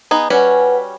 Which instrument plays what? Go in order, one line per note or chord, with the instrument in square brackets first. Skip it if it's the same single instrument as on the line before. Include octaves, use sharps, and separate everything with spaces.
[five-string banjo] B3 D#4 G#4
[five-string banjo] G3 C#4 F#4 [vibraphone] B4 F#5 G#5